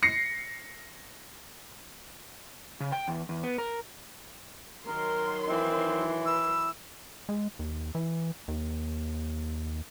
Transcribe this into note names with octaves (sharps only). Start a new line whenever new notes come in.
A#6 C7 C#7
C#3
G5
E2
E2
B3
A#4
D#3 F#3 A#4 C6
E3 C4
B4 E6
G#3
D#2
E3
D#2